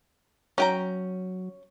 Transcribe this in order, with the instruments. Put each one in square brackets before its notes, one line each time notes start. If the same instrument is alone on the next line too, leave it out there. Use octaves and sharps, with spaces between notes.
[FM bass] F#3 [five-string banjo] C#4 G5 A#5